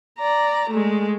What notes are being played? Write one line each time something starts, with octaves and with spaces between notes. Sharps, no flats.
D5 A#5
G#3 A3